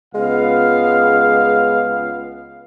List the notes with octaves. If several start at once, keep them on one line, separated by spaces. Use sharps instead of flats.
C#2 G#3 B3 F5